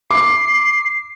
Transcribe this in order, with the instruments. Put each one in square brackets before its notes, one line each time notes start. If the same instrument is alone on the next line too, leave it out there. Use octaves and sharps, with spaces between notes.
[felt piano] D6 [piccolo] C7